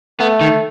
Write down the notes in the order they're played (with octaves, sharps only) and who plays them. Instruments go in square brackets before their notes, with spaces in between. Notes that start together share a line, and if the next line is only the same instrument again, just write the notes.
[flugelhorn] A3 [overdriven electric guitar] B3
[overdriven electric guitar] D#3